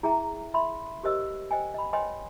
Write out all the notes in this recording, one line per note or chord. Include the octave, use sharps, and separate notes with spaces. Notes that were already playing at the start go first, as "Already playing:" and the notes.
E4 G#4 E5 G5 A#5
E5 B5 C6
G4 A#4 C5 D#5 E6
C5 D#5 G5 G#5
D#5 B5
B4 C#5 D#5 G5 G#5 C6